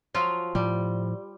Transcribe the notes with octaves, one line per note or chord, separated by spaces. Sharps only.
F3 F#3 F4
A2 F3 G3